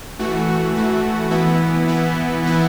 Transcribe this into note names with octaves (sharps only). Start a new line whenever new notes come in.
E3 A3 F#4
E3 A3 F#4
E3 B3 E4
E3 B3 E4
E3 B3 E4